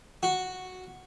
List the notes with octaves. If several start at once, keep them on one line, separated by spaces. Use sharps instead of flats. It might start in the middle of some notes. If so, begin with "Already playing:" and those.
F#4